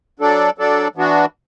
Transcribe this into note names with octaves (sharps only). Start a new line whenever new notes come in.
F#3 D4 A4 D5
F#3 D4 A4 D5
E3 B3 D4 F#4